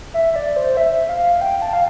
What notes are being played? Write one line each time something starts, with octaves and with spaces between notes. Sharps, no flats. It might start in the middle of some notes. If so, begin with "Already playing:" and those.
E5
D5
C5
E5
F5
G5
A5
F5